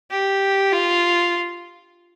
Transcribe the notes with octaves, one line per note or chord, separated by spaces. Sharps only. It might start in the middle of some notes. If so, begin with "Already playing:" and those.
G4
F4